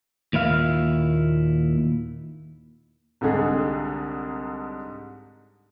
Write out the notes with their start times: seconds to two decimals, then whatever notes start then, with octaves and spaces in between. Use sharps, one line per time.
0.33 D#2 A#2 E4 F5
3.21 C2 G#2 D3 G#4